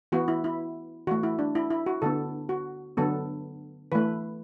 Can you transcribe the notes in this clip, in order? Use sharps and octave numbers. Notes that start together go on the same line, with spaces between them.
E3 B3 F#4
E4
E4
E3 A3 F#4
E4
D4
E4
E4
F#4
D3 B3 A4
F#4
D3 F#3 B3 A4
E3 A3 B4